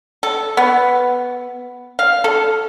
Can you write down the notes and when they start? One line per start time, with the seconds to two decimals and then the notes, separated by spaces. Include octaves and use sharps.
0.23 A4
0.57 B3
1.99 F5
2.24 A4